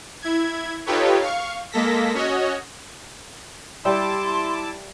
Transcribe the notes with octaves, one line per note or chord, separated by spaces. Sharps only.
E4 G#6
D#4 F4 G4 A4 B4 C#5
F5 C#6
G#3 A#3 A4 A#6 B6
C#4 F#4 C#5 D#5
G3 E4 E5 G5 A5 C6 D6